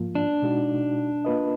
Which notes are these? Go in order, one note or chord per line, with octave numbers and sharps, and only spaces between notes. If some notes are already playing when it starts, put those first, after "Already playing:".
Already playing: G#2 F3 A#3 F4
D4
B2 G#3 D#4 F#4
A#3 F4 B4 D#5